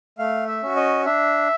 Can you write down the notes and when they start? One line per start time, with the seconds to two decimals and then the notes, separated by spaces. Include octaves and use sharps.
0.18 A3 F5
0.47 E5
0.63 C#4 F#4
0.76 D#5
1.05 D4 E5